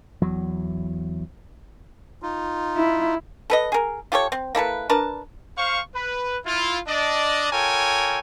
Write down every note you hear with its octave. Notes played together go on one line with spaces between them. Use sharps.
E2 F#3
D#4 F4
E4
A4 B4 D#5
G#4 A#4
F4 G4 A4 C#5
C4
A#3 E4 A4 B4
D4 A#4 B4 A5
C5 F5 C#6
B4
E4 F4
D4 D5 D#5
F4 A4 A#4 C#5 G5 G#5